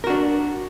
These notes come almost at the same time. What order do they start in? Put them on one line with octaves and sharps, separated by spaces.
A#4 F#4 D4